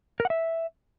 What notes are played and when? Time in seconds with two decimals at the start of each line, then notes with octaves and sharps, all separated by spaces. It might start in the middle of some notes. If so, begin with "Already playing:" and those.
0.20 A#4
0.25 F#5
0.30 E5